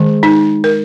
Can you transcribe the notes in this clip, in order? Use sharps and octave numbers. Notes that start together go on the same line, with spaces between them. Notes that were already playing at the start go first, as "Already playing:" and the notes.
Already playing: D#3 G#3
D#4
A#4